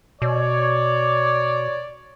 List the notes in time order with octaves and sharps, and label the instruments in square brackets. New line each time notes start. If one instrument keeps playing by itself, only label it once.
[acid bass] B2 [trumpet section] C#5 [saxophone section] D5